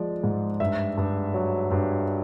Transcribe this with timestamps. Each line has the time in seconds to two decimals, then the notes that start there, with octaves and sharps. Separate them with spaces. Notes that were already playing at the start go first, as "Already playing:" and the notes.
Already playing: F3 G#3 D5
0.24 G#2
0.60 G2 E5
0.97 G2
1.34 F#3
1.71 G2